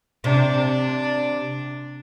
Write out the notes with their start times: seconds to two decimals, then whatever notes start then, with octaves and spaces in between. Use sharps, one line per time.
0.24 C3 D4